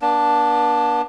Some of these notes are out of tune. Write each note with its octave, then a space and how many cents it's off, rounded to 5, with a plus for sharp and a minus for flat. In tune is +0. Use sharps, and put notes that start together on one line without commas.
B3 -45 D4 +0